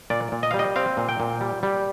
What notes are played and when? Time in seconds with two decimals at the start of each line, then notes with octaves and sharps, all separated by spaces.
0.10 A#2 D5
0.32 A#2
0.43 D#5
0.51 G3 F5
0.59 D#5
0.76 C4 F5
0.97 A#2
1.09 G5
1.20 A#2
1.41 G3
1.63 G3